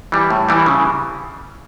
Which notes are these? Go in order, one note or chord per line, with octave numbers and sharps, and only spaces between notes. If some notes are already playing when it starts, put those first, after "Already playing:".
E3 G3
A2
E3 G3
C#3